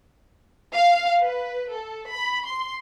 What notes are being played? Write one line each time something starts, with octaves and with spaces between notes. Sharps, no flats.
F5
B4
A4
B5
C6